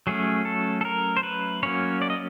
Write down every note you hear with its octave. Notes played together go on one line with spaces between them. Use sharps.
F#3 A3 C#4 G#4
A4
A4
A#4
C5
B4
F#3 A#3 C#4 C#5
D5
D#5